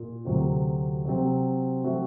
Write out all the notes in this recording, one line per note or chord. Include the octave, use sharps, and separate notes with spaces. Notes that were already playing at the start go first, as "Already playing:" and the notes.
Already playing: A#2
D2 C3 F#3 C4
C3 F#3 C4
F#3 A3 C4 F#4